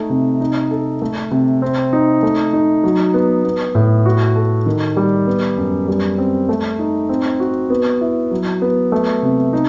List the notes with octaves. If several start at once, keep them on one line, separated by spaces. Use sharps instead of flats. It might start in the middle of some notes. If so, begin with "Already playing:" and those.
Already playing: A3 D#4
C3
D#4
A4
A3
C3
C4
D#4
A3
D#4
F#3
B3
B3
A2
F#4
A4
D#3
G3
B3
F#2
G3
C4
A3
D#4
C4
F#4
B3
E4
F#3
B3
A3
C3
D#4